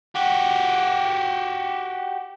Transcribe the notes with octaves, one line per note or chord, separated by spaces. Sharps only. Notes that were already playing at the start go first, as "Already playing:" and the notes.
F#4 G4